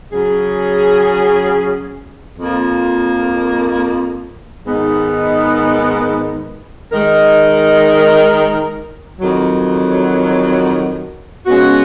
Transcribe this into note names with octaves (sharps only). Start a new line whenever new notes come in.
C#3 F#3 C#4 G#4
F2 F3 A#3
G#2 D#3 G#3 B3 D#4
D#3 G#3 D#4 A#4
F2 D#3 F#3
C#3 G#3 B3 F#4